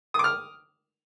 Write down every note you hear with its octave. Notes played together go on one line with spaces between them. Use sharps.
D6 D#6 F6